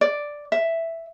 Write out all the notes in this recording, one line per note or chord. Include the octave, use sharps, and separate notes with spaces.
D5
E5